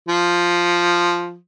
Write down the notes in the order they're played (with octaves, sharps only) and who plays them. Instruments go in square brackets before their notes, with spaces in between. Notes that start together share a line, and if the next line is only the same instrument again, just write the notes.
[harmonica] F3